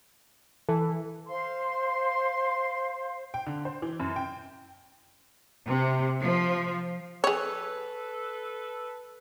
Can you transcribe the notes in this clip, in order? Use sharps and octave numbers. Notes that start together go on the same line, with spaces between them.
E3 A4
C5 F5 C6
G5
D3
C5
E3
F#2
G5
C3
F3
G#4 A4 B4 C#5